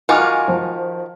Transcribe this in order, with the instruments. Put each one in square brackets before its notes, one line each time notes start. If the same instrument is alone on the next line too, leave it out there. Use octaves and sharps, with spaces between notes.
[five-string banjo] D#3 F4 F#4 [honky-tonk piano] G#5 D6 F6
[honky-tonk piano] F3